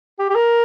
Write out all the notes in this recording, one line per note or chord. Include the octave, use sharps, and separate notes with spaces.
G4
G4
A#4